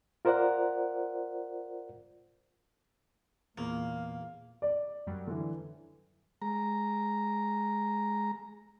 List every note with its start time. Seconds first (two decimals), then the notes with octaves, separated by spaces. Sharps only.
0.25 F4 A#4 C5 D5 F#5
3.58 E2 A#2 A#3 F5
4.62 D5
5.07 F#2 F#3 G3
5.27 D3 E3
6.42 G#3 A#5